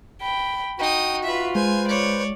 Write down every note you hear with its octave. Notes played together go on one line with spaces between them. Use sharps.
G5 B5
D#4 F#4 G5 D#6
F4 B4 E5
G#3 B4 C5 G#5
C#5 D5